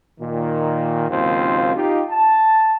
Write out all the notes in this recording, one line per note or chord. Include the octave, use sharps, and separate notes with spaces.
A#2 D#3
F#1 D#2 G#2 C4 F4 C5
D#4 F4 G4
A5